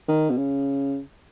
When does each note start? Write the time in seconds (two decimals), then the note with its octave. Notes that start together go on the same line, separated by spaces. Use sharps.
0.08 D#3
0.30 B2
0.37 C#3